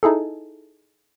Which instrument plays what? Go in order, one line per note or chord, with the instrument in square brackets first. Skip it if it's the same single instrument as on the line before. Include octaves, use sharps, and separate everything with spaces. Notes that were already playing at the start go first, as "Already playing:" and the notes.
[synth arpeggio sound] D#4 E4 G#4 A4